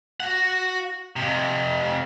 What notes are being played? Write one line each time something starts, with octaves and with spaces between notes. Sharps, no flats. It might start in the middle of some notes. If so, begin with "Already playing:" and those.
F#4 F#5
F2 C3